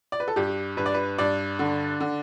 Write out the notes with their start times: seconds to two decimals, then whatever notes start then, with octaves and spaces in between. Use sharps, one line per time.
0.12 D5
0.20 B4
0.28 A4
0.36 G2 G4
0.77 G2 B4
0.86 D5
0.94 B4
1.18 G2 D5
1.59 D3
2.01 D3